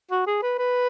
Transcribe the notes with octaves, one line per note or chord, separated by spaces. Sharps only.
F#4
G#4
B4
B4